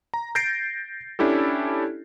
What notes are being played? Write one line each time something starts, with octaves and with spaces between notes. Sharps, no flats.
A#5
G6 A6 A#6 C7 D7
C#4 D4 E4 G4 A4